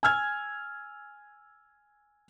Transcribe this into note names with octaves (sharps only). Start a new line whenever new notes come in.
G#5 E6 F6 G#6